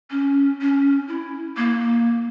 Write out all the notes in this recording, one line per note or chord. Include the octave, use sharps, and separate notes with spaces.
C#4
C#4
E4
A#3